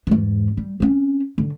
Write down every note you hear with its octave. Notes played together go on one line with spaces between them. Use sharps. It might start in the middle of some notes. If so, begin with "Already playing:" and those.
E2 G#2
G3
C4 C#4
D3